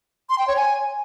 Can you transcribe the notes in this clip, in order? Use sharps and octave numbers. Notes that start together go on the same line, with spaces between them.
C6
G5
C#5
G#5